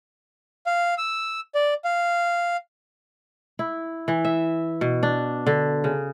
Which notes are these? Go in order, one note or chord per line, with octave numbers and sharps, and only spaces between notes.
F5
E6
D5
F5
E4
E3
E5
B2
D4
D3
C#3